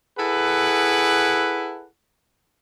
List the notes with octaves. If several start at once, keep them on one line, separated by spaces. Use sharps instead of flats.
E4 G#4 A4 B4 F#5